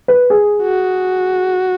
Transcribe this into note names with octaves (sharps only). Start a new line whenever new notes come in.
B4
G#4
F#4